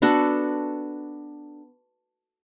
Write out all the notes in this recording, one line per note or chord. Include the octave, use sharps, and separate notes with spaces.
B3 D4 F#4 A4